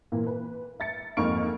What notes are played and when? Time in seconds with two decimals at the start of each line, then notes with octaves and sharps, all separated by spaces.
0.12 A#2 E3 A#3
0.27 B4
0.80 E5 A6 C#7
1.17 F2 G#2 A#3 C#6 F6 D7